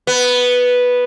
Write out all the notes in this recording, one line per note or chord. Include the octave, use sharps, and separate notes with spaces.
B3